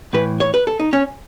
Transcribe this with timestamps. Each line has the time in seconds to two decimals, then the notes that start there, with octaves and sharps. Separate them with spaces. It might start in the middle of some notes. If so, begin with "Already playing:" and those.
0.13 A2 E3 B4
0.40 C#5
0.54 B4
0.67 A4
0.80 D#4
0.93 C#4